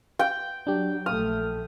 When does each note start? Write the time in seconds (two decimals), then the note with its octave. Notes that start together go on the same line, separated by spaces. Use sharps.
0.19 G5
0.67 F#3 D4 G4
1.06 A#1 A3 D#6 F6